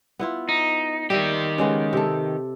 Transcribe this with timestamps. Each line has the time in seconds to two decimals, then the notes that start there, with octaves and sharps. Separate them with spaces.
0.19 B3 E4 F4
0.49 D#4
1.10 D#3 G3 G4 D#5 E5
1.58 C#3 G#3 B3
1.93 C3 A4